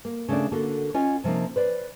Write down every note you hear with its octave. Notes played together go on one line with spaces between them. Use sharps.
A#3
C#3 A3 A#3 D4
D3 A#3 F#4 A4
C#4 F4 D#5 F#5 G#5
C3 F3 G#3 A#3 D#4
B4 C5 D5